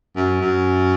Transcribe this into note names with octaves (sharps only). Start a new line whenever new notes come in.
F#2
F#2